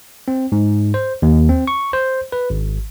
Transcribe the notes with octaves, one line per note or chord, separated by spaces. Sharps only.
C4
G#2
C5
D#2
C4
C#6
C5
B4
G#1